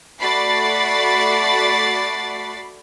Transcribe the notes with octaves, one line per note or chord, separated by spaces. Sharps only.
A3 F#4 D5 B5 A6 C7